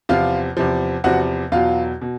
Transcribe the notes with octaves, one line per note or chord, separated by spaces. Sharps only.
E2 C3 F3 F4 F5
E2 C3 F3
E2 C3 F3 F#4 F#5
E2 B2 F#3 F4 F5
B2